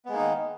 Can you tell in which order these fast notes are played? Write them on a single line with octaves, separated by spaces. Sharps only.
B3 G#3 A#3 D#4 D#3